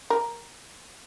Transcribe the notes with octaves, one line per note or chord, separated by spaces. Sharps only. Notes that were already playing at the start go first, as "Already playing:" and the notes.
A#4